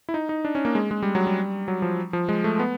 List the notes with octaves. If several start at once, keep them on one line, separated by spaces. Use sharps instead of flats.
E4
D#4
D#4
D4
C#4
A#3
G#3
G#3
G3
F#3
G3
F#3
F3
F3
G#3
A3
B3